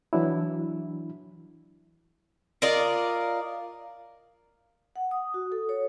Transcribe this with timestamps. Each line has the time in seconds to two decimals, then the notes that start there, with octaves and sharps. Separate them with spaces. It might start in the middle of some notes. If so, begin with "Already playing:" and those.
0.13 E3 F#3 D4 E4
2.62 F4 A#4 D5 D#5
4.96 F#5
5.11 D#6
5.34 F#4
5.52 A4
5.69 C#5